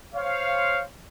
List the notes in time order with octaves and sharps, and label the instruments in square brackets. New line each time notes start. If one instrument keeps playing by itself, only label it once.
[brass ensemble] C5 C#5 F5